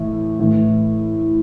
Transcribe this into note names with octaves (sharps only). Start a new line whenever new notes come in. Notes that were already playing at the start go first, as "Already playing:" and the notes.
Already playing: A2 E3
A2 E3